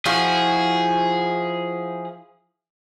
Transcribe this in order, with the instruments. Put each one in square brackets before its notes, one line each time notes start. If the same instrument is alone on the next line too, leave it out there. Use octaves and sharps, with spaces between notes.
[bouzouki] F3 E4 F#4 [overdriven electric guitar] G#4